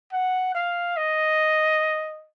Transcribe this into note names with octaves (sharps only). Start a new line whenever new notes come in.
F#5
F5
D#5